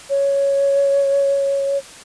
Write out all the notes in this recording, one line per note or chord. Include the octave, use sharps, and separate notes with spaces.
C#5